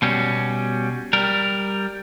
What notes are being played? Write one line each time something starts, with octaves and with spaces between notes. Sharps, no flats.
B2 G3 C#4
G3 A#4